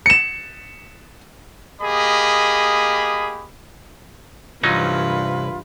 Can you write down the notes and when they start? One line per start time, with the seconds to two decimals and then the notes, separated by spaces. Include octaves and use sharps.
0.06 C#7 E7
1.81 A#3 G4 G#4 D#5 B5
4.64 C2 G2 E3 F#3 C#4 D#4 F4 B4